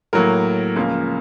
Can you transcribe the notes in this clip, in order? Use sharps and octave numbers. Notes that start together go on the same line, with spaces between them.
A2 F#3 A#3 A#4
C#2 C#3 F3 A#3